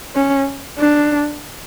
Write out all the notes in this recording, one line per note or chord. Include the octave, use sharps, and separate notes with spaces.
C#4
D4